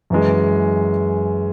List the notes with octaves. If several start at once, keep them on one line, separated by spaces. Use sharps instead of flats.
F#2 E3 G#3